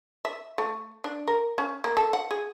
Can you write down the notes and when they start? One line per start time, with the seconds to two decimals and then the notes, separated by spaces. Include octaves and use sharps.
0.25 E5
0.58 A3
1.04 D4
1.28 A#4
1.58 C#4
1.84 A#3
1.97 A4
2.13 F#5
2.31 G#4